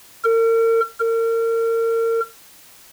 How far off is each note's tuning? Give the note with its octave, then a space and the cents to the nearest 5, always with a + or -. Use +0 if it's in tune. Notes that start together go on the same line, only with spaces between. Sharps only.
A#4 -40
A#4 -35